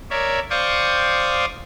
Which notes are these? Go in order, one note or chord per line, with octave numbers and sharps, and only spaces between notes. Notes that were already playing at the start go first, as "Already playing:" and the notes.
A#4 C#5 D5 E5
C5 D5 F5 G5 C#6 D#6